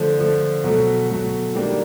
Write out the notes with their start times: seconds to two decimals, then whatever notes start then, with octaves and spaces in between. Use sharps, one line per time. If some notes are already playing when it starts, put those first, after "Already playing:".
Already playing: D3 F3 A3
0.19 D3 F3 A3
0.64 B2 F#3 A3
1.09 B2 F#3 A3
1.55 D#3 G3 A#3 D4